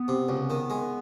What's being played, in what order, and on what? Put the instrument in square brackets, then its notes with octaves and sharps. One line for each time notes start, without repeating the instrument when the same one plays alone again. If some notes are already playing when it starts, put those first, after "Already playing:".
Already playing: [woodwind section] B3
[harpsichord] C3
C#2
D#3
G#3